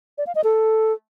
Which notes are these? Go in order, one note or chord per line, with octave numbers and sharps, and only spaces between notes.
D5
F5
D#5
A4